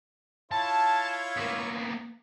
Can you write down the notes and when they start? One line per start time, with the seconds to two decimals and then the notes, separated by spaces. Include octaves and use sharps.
0.52 E4 F4 C#5 A5
1.37 A#3 B3